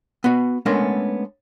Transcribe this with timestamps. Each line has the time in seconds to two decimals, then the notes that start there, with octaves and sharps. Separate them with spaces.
0.24 B3 F#4
0.66 G#3 A3 B3 C#4 D4 A#4